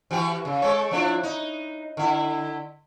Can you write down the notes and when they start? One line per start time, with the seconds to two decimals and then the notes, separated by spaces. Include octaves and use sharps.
0.11 E3 F#4 G4
0.45 C#3
0.62 G#3 A4 C#5
0.91 F3 D4 E4
1.23 D#4
1.97 D3 E4